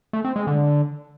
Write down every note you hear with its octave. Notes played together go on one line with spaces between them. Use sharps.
A3
C4
G#3
D3